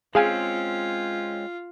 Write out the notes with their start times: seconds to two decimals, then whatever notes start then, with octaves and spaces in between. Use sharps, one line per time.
0.15 G#3 C4 C#4 F4 G#4 F5 G#5